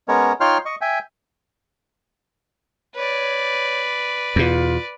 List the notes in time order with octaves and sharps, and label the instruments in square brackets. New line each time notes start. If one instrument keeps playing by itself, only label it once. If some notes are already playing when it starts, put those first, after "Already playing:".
[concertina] G#3 B3 C#4 A#4 C#5
D#4 F4 C#5 G5 C6 F6
D#5 C#6
E5 G5 G#5
[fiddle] B4 D5 [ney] C#5
[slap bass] E2 B2 [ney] F4